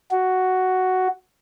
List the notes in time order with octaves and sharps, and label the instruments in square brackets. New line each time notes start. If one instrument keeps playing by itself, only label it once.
[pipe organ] F#4